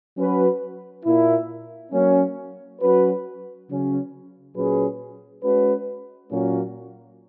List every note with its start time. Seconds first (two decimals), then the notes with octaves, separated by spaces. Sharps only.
0.17 F#3 C#4 F#4 B4
1.05 A#2 A#3 E4
1.92 F#3 A#3 C#4
2.81 F#3 C#4 F#4 B4
3.69 C#3 F#3 C#4
4.56 A#2 F#3 C#4 G#4 B4
5.44 G#3 C#4 F#4 B4
6.31 A#2 F#3 A#3 C#4 F#4